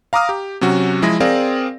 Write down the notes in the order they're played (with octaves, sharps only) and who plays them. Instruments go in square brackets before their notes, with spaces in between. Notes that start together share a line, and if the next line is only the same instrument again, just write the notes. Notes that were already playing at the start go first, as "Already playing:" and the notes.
[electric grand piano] F5 A#5 D6 D#6 F6
G4
C3 F#3 C#4 F#4
F3 G#3 E4 G#4 A#6
C4 G#4 A#4 D5 F5